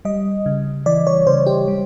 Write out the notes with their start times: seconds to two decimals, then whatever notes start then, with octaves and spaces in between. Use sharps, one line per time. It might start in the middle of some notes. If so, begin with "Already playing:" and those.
0.05 G3 D#5
0.46 C#3
0.86 E3 D5
1.07 C#5
1.27 C#3 C5
1.46 G4
1.68 G3